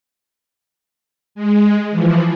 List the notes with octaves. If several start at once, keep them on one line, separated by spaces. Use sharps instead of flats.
G#3
E3 F3